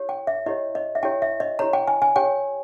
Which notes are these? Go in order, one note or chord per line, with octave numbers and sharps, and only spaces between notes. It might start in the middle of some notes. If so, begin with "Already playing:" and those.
Already playing: E4 G4 C#5
G5
E5
E4 G4 C#5 D#5
D#5
E5
E4 G4 C#5 G5
E5
D#5
E4 G4 C#5 A#5
G5
G#5
G#5
G4 C#5 G5